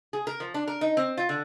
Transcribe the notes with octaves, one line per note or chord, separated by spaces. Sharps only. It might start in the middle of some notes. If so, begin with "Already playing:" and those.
G#4
A#4
F3
D4
A#4
D#4
C4
F4
D3